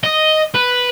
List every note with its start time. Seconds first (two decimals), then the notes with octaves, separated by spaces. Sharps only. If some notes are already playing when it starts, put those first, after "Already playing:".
0.04 D#5
0.54 B4